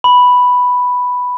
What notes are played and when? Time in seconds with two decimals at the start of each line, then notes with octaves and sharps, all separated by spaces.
0.04 B5